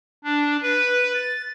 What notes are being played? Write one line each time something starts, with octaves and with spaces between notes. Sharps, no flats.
D4
B4
A6